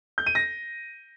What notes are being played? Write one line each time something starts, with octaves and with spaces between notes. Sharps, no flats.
G6
D#7
A#6